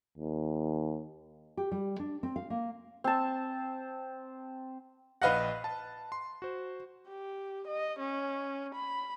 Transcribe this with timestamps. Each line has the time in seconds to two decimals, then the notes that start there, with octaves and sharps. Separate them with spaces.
0.18 D#2
1.57 G4
1.72 G3
2.00 D4
2.23 C4
2.36 F5
2.50 A#3
3.04 C4 A5
5.22 A#1 B4 D#5 F5 F#5 A#6
5.64 A5
6.12 C6
6.42 F#4 C5
7.08 G4
7.67 D#5
7.99 C#4
8.75 B5